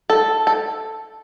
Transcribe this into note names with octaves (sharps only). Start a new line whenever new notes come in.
A4
A4